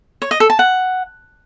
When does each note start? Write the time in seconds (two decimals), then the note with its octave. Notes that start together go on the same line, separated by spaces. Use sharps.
0.22 C#5
0.31 D#5
0.40 A4
0.50 A5
0.59 F#5